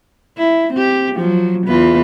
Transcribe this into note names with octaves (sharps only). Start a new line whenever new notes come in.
E4
C4 G4
F3 F#3
E2 F4 B4